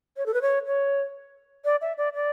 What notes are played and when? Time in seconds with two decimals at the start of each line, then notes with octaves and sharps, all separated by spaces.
0.17 C#5
0.26 A4
0.34 B4
0.42 C#5
0.66 C#5
1.65 D5
1.81 E5
1.98 D5
2.14 D5